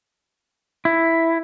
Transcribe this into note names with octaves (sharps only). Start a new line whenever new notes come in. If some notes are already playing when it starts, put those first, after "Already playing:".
E4